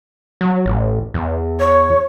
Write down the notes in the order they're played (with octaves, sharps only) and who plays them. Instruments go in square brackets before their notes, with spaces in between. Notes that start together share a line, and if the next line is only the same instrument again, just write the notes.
[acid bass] F#3
A1
E2
[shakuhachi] C#5